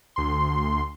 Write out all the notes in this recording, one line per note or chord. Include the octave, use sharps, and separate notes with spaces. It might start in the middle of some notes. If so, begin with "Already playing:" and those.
D2 C6